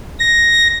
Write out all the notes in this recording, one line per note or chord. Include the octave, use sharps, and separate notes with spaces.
A#6